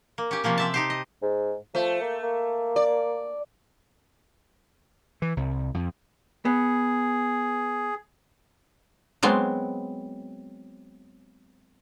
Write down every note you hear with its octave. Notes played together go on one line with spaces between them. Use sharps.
A#3
C#4 G4
C3 F3 A#3 C#4
C4 E5 A5
D#4 G4 C5
D#5
G#2
F3 A3
A#3
A#3
D5
E3
C2
F2
B3 G#4
F#3 G#3 B3 C4